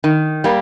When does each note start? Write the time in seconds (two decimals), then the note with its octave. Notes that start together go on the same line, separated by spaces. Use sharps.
0.04 D#3
0.44 G3 A#3